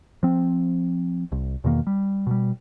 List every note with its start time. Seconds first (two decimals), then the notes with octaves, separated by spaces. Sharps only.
0.23 F3 C4
1.32 C2
1.64 E2 B2 D#3 A#3
1.87 G3
2.27 B2 G3